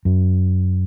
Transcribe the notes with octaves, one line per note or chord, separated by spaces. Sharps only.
F#2